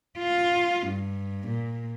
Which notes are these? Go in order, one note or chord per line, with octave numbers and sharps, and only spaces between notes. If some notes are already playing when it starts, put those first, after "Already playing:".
F4
G2
A#2